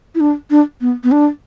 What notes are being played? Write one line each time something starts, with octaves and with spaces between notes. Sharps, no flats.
E4
D4
D4
B3
B3
D4